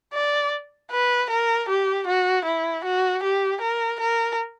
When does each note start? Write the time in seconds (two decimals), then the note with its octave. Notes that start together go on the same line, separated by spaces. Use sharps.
0.14 D5
0.91 B4
1.30 A#4
1.69 G4
2.07 F#4
2.45 E4
2.85 F#4
3.23 G4
3.61 A#4
4.00 A#4